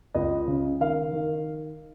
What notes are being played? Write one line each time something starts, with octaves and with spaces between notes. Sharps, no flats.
C#2 D#5
C#3
D#3 F5
D#3